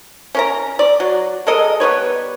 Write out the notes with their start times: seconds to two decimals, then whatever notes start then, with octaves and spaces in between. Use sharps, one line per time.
0.35 C#4 A#4 A#5
0.79 D5
1.00 F#3
1.47 G#3 A4 A#4 D#5
1.80 G3 B3 B4 C#5